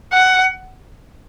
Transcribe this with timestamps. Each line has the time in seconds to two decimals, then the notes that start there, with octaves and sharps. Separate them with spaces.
0.13 F#5